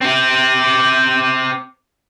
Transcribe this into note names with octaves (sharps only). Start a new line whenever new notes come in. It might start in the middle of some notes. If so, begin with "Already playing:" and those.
C4 G4